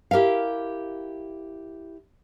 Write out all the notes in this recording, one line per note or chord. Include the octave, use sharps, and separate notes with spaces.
E4 G4 A#4 E5 F5